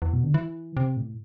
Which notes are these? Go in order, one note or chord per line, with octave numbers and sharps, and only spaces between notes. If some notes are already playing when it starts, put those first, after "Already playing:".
E2
B2
D3
E3
C3
A2